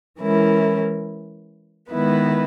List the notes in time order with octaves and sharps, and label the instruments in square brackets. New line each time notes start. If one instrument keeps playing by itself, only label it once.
[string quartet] E3 G#3 C#4 E4 A#4
D#3 G#3 B3 E4 B4